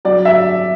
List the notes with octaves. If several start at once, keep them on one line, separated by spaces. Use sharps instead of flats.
F#3 D5
E5